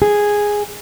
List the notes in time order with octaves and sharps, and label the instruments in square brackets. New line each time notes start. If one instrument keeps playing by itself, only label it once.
[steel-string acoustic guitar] G#4